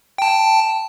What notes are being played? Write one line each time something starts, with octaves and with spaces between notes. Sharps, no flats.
G5 A5